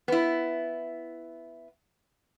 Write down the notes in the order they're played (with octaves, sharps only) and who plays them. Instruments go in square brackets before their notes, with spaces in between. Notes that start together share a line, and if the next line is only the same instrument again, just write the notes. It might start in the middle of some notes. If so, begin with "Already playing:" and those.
[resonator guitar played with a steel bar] B3 E4